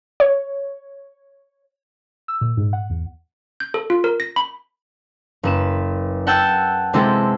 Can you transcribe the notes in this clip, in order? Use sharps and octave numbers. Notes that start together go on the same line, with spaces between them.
C#5
E6
A#2
G#2
F#5
E2
G6
A4
F4
A#4
A#6
B5
F#1 B4 E7
F#5 G5 A5 E6 G6
C3 G#3 C4 E4 G4 A4